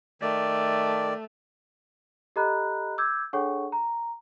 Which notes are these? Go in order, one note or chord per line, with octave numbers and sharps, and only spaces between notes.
D#3 A3 D5
G4 A4 D#5 A#5 B5 F#6
D6 E6 G6 G#6
D4 G#4 A4 C#5 F#5 C#6
A#5